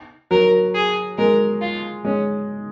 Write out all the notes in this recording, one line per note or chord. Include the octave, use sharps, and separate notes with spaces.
F#3 A#4
G#4
G#3 A#4
F4
G#3 C#4